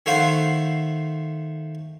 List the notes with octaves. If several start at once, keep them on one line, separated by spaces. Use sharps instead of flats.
D#3 A3 E4 C5 F5 F#5